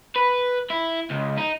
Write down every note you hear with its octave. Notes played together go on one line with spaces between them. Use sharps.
B4
E4
C#2
D#4